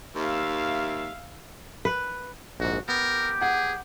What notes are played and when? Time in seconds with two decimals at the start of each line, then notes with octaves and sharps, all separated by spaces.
0.15 D#2 E5 F5
1.85 B4
2.60 A#1 G#2 F#4
2.89 B3 G4 A#4
3.41 G#4 F#5